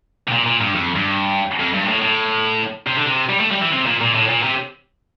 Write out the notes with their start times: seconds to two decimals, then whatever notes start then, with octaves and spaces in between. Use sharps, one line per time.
0.28 C3
0.32 A#2
0.46 A#2
0.61 G2
0.75 F2
0.96 G2
1.60 F2
1.74 G2
1.83 A#2
1.88 A2
2.02 A2
2.87 C3
2.96 D3
3.06 C3
3.30 G3
3.41 A3
3.52 G3
3.62 E3
3.73 C3
3.86 A#2
4.01 A#2
4.15 A2
4.29 A#2
4.43 C3